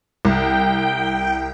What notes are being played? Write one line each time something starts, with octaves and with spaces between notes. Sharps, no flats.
C2 G5